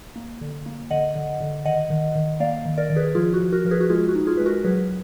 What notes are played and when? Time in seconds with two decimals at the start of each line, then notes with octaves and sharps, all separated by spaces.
0.16 A#3
0.41 D3
0.66 A#3
0.90 D3 D#5 F#5
1.16 D3
1.40 D3
1.65 D#3 D#5 F#5
1.90 D#3
2.15 D#3
2.40 A#3 D5 F5
2.65 D#3
2.78 A#4 D5
2.90 D#3 D5
2.96 G#4 B4
3.15 F3 F4 G#4
3.34 F#4
3.40 F3
3.52 F#4 A#4
3.65 F3 A#4
3.71 G#4 B4
3.80 F#4
3.90 G#3 F4 G#4
4.08 F#4
4.15 D#4
4.27 F4 G#4
4.37 G#3 B4
4.46 F#4 A#4
4.64 F#3 G#4 B4